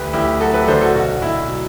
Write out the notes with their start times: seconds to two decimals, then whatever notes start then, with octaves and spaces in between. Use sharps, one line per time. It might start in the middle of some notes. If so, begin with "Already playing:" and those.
Already playing: D2 G4 B4
0.13 D2 E4 G4
0.40 F#3 F#4 A4
0.54 G4 B4
0.67 D3 A4 C5
0.81 F#4 A4
0.95 B1 F#4
1.22 B1 E4
1.50 F#3